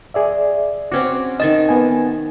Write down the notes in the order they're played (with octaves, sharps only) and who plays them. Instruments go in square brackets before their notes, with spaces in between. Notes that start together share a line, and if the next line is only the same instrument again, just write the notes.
[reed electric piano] G#4 D5 E5
[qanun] C4 C#4 F#4 [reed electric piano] D6
[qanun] D#3 E5 A5 [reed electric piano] D#5 A6
[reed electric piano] B3 G#5